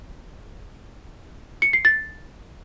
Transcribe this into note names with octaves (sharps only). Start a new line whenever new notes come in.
C#7
C7
A6